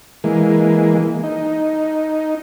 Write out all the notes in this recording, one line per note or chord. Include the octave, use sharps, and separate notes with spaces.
E3 G#3 A#3
D#4